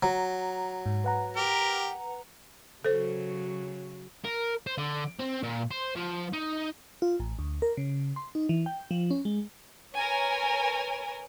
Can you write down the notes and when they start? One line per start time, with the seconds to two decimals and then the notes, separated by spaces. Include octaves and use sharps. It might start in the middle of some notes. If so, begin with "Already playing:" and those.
0.03 F#3 A#5
0.86 G#2
1.04 B4 F#5 A#5
1.37 G4 A#4
2.85 C#3 F#3 A4 C5
4.25 A#4
4.67 C5
4.78 D3
5.19 C4
5.43 A#2
5.71 C5
5.96 F3
6.33 D#4
7.02 F4
7.20 A1
7.39 D2
7.62 A#4
7.77 C#3
8.16 C6
8.35 D#4
8.49 E3
8.66 G5
8.91 F3
9.11 C#4
9.25 G#3
9.94 A#4 B4 C#5 G#5